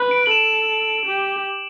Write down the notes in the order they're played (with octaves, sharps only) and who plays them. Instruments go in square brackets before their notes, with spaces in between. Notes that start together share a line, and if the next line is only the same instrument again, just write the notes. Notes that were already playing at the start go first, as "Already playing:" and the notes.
Already playing: [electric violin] B4
[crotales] D7
F#7
[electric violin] A4 [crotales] E7
[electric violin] G4